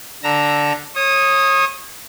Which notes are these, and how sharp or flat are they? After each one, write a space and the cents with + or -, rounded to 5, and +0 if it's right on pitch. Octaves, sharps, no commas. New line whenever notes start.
D3 +0 A#5 +0 E6 +0
C#5 -30 D#6 +0